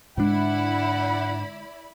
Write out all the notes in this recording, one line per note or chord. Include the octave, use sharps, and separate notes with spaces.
G#2 D3 G#3 D4 E4 D5 F#5 B5